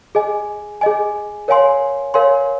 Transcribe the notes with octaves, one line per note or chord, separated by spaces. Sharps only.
G#4 D#5 G#5
G#4 D#5 G#5
A#4 C#5 F5 G#5 C6
A#4 C#5 F5 G#5 C6